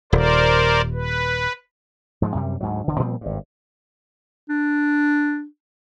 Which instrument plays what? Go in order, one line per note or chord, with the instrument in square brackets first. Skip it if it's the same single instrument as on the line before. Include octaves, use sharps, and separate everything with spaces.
[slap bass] D#1 [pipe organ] A#4 C5 D5
[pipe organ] B4
[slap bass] G#2 F3 F#3 G#3
F#2 C3 G3
D2 G#2 F#3
E1 D3
A#2 F3 G3 C4
G#1 G2
[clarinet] D4